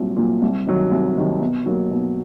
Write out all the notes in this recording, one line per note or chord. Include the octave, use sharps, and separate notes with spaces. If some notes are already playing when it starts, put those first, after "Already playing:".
Already playing: C2 A#2 F#3
A#2 F#3
C2
C3 D#3 F#3
C2
C3 D#3 F#3
B2
F#3 A#3
B2